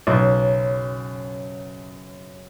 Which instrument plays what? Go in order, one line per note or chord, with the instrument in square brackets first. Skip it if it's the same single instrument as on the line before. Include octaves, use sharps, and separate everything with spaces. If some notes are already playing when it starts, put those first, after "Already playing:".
[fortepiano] B1 [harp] F#2 C#3